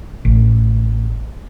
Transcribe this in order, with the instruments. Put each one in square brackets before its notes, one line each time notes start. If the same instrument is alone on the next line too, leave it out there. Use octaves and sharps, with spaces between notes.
[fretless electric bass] A1